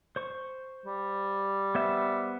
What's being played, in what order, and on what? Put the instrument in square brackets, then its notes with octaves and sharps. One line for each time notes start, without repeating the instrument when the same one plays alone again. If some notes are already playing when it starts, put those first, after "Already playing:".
[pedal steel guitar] C5 C#6
[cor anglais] G3
[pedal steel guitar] B3 C5 E5